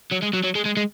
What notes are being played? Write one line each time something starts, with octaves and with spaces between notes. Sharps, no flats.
F#3
G#3
F#3
F#3
G#3
G#3
G#3